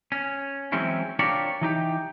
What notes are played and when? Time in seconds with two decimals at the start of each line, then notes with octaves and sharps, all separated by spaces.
0.12 C#4
0.72 E3 F#3 G#3 C4 C#4 E4
1.19 D4 F4 G4 A#4 C#5 D5
1.61 E3 D#4 G4